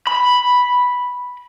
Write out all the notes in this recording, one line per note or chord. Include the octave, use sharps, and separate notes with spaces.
B5